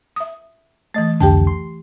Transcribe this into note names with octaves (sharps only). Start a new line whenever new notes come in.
E5 D#6
E3 A3 D#5 A6
C2 F2 D3 G4 G5 A5
C6